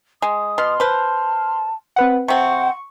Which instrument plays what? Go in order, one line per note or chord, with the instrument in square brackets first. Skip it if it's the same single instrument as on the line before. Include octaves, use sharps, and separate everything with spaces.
[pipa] G#3 [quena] D#6
[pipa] B2 [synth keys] C6 F6
[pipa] B4 C5 [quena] A5
[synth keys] C4 B4 F#5
[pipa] C3 C4 [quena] F#5 [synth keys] C#6